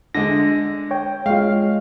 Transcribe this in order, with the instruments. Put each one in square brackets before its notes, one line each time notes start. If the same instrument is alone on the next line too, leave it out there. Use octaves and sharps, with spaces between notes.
[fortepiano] D3 G#3 [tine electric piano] A#6
[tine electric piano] C#5 G5
[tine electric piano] G#3 F4 [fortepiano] F5